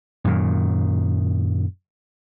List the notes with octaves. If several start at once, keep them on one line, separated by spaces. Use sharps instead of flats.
F#2 A#2 D#3